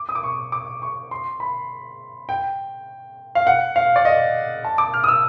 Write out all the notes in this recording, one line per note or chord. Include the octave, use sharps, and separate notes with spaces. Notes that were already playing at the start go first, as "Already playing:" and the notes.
Already playing: D6
D#6
D6
C#6
D6
C#6
C6
B5
G5
F5
F#5
F5
D5
D#5
A5
D6
F6
D#6
E6